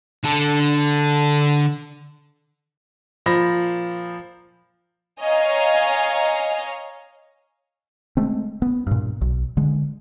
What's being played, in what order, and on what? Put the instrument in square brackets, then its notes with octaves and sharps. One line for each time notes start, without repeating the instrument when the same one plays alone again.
[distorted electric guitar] D3 A4
[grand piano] A#2 F3 B5 A#6
[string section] C#5 D#5 F5 G#5 A#5
[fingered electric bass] G#3 A3 C4
B3
G2 A#2
B1
D3 G#3